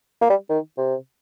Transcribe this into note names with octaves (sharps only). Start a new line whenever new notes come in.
A#3
G3
D#3
C3